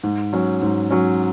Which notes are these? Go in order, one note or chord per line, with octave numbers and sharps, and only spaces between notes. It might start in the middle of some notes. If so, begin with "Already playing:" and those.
G#2
F#3 C#4
G#2
F#3 C#4